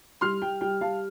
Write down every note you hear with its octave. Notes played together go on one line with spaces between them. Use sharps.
G3 C6 F6
G3 G5
G3 G5
G3 F5 A5